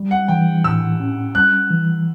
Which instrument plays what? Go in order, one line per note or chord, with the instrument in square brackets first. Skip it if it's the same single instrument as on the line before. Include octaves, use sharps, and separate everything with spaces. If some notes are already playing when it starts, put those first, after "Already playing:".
Already playing: [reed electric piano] G3
[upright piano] F#5
[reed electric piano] E3 [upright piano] G5
[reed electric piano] A2 [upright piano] E6
[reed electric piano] C#4
[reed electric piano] G3 [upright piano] F#6
[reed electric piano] E3